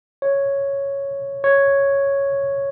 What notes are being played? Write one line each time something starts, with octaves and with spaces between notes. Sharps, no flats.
C#5
C#5